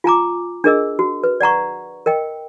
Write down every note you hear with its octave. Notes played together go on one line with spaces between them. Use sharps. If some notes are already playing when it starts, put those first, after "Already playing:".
F4 G#5 A#5 D6
D4 G#4 A#4 D#5 E6
F#4
B4
D5 F#5 A#5 C#6
A#4 D#5 G5